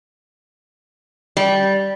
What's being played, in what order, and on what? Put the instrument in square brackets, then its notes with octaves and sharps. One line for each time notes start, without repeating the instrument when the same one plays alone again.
[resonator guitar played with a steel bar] G3